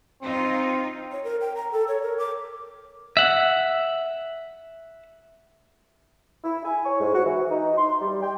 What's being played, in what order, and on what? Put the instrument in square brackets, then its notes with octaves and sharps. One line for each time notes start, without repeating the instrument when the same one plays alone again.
[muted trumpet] C4 [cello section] D#4 F4
[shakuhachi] C#5
A#4
G5
A#5
A4
C#5
A#4
D6
[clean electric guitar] E5 F#5
[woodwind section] E4
G#5
C#5
G#2
F#4
E3
D#4
C6
G3
G5